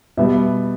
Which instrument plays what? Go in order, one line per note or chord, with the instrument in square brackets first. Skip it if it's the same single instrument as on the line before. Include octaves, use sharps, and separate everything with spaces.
[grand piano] B2 G3 B3 E5